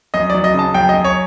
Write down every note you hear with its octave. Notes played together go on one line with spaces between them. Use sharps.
F#2 D#5
F#3 D5
D#5
C#3 A5
F#2 G5
D#5
F#2
C#5